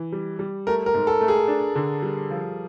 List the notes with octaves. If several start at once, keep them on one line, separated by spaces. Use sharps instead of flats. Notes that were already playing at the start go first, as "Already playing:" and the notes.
Already playing: E3
G3
G3
A3 A#4
A#4
G#2
A4
A3
G#4
D4
D3
G3
F3